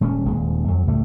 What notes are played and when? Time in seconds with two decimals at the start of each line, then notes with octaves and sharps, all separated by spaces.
0.01 D#1 G#3 A#3 C#4
0.25 D#1 D#2 G#3
0.68 F2 F#3
0.87 C#2 A2 G3 A3